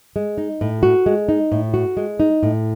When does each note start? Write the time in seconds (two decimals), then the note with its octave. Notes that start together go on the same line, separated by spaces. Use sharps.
0.16 G#3
0.38 D#4
0.61 A2
0.83 F#4
1.06 G#3
1.29 D#4
1.52 A2
1.74 F#4
1.97 G#3
2.20 D#4
2.43 A2